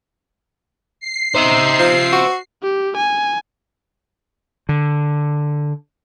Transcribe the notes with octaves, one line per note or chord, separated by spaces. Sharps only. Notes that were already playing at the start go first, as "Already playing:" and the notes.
C7
D#4 C5 E5
F3
F#4
G4
G#5
D3